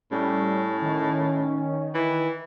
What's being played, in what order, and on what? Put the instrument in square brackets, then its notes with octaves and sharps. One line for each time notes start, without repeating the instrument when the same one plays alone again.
[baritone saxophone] A2 [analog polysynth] G3 [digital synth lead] C#4
[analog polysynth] D#3
[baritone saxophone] E3